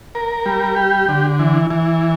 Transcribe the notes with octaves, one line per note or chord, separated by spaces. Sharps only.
A#4
G3
G4
D3
E3
E3